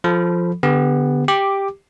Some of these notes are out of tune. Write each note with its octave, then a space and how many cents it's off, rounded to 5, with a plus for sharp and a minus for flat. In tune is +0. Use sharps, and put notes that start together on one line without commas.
F3 +0 A4 -5 B5 +0
D3 -5 B3 +0 G4 +25
G4 +5 D6 +0